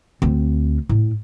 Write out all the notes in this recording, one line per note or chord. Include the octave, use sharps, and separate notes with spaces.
D2 C4
A2